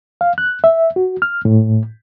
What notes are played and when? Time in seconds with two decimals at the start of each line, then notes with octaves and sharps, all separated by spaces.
0.21 F5
0.38 F#6
0.64 E5
0.96 F#4
1.22 F6
1.45 A2